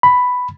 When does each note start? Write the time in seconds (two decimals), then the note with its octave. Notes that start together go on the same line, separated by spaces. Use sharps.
0.03 B5